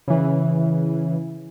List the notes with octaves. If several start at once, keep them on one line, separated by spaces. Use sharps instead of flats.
C#3 E3